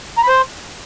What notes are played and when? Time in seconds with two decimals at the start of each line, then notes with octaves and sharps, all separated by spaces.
0.18 A#5
0.23 B5
0.28 C5